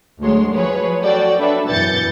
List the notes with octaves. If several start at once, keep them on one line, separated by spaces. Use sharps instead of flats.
D2 F#3 G#3 C#5 C6
F3 F#3 G#4 B4 C#5
F#4 A4 C#5 D5 G5
D4 A4 B4 E5
F#2 B2 E3 G6 A6 C#7